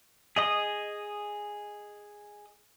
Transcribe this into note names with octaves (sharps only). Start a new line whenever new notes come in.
G#4 D#5 D#6